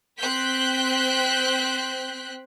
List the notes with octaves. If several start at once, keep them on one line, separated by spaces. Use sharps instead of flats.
C4 F#6 G6 B6